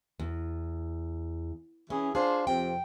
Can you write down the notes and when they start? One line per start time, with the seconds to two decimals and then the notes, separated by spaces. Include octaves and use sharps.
0.20 E2
1.90 E3 C#4 E4 G#4
2.15 D4 F4 G#4 C5
2.47 F2 C3 F3 G5